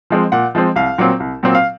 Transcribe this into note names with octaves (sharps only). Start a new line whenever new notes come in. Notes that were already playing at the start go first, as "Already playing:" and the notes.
F3 G#3 C4
A#2 F#5
F3 G#3 C4
C2 F5
A#2 F#3 C4
C2
A#2 F#3 C4
F5